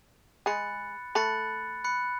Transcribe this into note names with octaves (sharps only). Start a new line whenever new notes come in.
G#3 G#4 B5 F#6 A6 C#7
A3 A4 B5 F#6 A6 C#7
B5 F#6 C#7